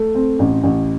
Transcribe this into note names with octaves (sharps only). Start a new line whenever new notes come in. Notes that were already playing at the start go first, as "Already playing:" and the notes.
Already playing: A3
C4
A1
A1